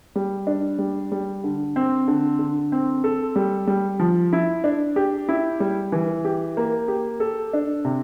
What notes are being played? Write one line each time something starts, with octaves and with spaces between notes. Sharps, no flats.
G3
D4
G3
G3
D3
C4
D3
D3
C4
A4
G3
G3
F3
E4
D4
G4
E4
G3
E3
G4
A#3
G4
A4
D4
C3